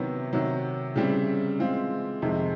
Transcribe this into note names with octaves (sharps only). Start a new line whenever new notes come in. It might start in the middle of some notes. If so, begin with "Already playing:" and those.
Already playing: C3 D#3 F#3 B3 E4
C3 D#3 F#3
C#3 E3 G3 C4 E4
E3 G#3 C4 F4
F2 C3 D#3 G#3